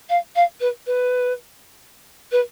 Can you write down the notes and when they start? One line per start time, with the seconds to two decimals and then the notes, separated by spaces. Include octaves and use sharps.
0.09 F5
0.36 F5
0.61 B4
0.87 B4
2.32 B4